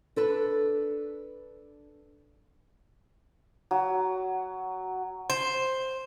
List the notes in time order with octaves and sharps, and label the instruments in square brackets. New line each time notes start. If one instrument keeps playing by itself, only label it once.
[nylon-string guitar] D4 A4 B4
[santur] F#3
[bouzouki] C5